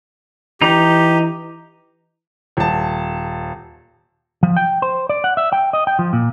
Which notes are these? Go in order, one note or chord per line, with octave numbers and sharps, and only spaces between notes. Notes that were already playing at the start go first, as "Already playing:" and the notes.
E3 D#4 G4 A#5
D#1 A5
F3
G5
C5
D5
F#5
E5
G5
D#5
G5
F3
A#2